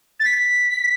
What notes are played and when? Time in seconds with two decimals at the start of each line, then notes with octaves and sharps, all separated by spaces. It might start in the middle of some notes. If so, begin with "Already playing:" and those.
0.20 A6
0.25 B6